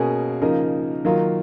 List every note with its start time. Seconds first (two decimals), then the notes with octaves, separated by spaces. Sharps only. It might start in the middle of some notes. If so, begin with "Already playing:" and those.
Already playing: B2 A#3 C#4 G#4
0.42 C#3 F3 A#3 D#4 A#4
1.05 D#3 F#3 A#3 F4